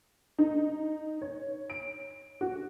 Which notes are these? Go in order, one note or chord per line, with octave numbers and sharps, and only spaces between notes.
D#4
C#5
D7
F#4